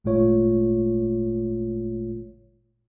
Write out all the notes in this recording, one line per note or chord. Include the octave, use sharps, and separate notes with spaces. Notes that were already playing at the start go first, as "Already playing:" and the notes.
G#1 A#2 G#3 A3 F4 C#5